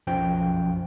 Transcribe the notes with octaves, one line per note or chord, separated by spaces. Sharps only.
B1 F#2 F3 G5